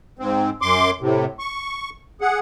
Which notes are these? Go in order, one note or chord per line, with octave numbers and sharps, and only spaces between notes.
G#2 C4
F#2 C6 D6
A2 C3
C#6
G#4 F#5